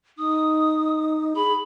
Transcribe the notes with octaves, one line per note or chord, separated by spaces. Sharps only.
D#4 D#6
G#4 B5